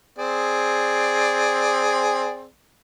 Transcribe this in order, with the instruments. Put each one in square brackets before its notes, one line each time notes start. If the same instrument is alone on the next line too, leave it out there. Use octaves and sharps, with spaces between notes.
[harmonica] C4 G#4 D5